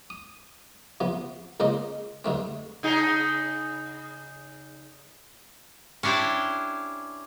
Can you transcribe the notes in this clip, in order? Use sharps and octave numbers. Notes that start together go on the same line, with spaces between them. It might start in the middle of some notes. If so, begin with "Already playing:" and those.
D#6
C3 F3 B3
C#2 C#3 A#3 F4 C5 D#5
G2 D3 A3 C4
C#3 D#4 G#4
C#4 D4 E4 G4 C5